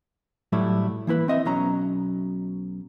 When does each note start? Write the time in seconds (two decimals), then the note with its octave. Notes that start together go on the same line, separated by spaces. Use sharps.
0.52 A2 F#3 G3 A3 E4
1.07 E3 A#3 E4 B4
1.28 C4 D#5 E5
1.45 B1 B2 F#3 C#4 A#5